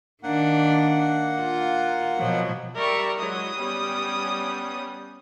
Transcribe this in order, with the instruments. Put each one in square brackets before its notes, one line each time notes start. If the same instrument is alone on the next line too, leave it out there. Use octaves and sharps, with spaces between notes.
[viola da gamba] D#3 D4 [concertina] A#3 F#5
[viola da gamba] F4
B2 F3 F#3
[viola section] G3 D5 E5 [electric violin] A#4 C#6
[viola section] F#3 G#3 E4 [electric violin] D#6
[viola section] G3 B3 C#4